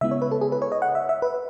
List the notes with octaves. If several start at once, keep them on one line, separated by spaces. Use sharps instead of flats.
C#3 G#3 B3 E4 E5
C#5
B4
A4
G#4
B4
C#5
D#5
F#5
E5
E5
B4